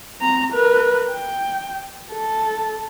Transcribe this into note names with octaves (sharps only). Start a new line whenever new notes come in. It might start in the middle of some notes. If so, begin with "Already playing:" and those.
C4 A#5
A#4 B4
G5
A4